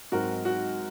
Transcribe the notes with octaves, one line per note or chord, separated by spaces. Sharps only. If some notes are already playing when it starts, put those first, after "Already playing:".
G#2 F#3 C4 F#4 A#4
F#4